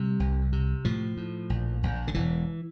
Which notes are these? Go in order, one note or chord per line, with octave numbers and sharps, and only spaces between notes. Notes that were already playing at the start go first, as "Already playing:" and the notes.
Already playing: C3 G3
C2
C3
A2 F3
A2
A#1
A#1
D3
E1 E3